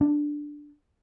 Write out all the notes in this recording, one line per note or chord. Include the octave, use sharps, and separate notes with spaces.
D4